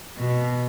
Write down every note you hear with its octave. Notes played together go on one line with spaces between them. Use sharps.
B2